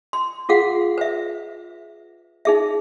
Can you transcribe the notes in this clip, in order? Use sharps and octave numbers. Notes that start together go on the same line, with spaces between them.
C6
F4 G#4 F5 F#5
B4 E5
D#4 G#4 E5